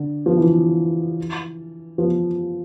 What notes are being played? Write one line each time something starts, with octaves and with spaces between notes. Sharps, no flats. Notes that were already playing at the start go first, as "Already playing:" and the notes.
Already playing: D3
F3
E3
F3